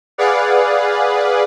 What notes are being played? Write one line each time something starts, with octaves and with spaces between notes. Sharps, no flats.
G#4 B4 D5 F5 F#5